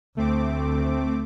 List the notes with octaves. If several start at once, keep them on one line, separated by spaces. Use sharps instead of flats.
D2 A3 C4 D6